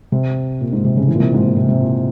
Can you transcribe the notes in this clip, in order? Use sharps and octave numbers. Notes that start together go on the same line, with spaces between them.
C3
A#2
G#2
C3
C#3
E3
A#2
C3
G#2
A#2
C3
C3
A#2